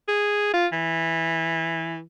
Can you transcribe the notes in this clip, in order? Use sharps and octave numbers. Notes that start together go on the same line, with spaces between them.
G#4
F4
E3